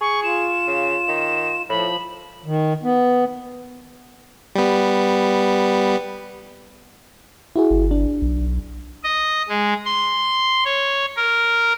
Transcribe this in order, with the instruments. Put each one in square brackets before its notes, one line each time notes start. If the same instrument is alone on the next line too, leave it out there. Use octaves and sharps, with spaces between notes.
[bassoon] G#4 [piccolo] C#6
[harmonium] F4 [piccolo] E7
[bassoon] C#3
D#3
[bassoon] A2 [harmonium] F3 [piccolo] B5
[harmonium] D#3
B3
[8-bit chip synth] G3 B3
[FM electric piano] E4 F#4 G#4
[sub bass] G1
[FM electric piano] D4
[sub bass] B1
[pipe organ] D#5
G#3
C6
C#5
A#4